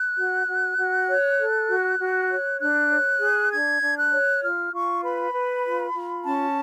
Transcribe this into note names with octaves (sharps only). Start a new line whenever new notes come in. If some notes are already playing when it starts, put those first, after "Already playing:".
Already playing: F#6
F#4
F#4
F#4
C#5
A4
F#4
F#4
C#5
D4 F#6
C#5
G#4
D4 G#6
D4
F#6
C#5
F4 F6
F4 C#6
B4 B5
B4
F4
F4
C#4 A5